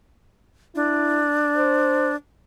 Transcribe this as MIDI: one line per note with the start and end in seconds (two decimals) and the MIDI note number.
0.76 2.15 62
0.76 1.26 64
1.57 2.11 72